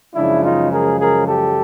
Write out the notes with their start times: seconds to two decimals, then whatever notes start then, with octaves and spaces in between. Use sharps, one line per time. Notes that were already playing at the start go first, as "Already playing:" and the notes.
0.15 F#2 C#3 F3 G#3 D4 E4
0.43 D#4 F4
0.72 G#4 A#4
1.00 G#4 A#4
1.28 G4 A4